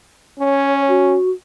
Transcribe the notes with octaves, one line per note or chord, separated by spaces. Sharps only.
C#4 C#5
F#4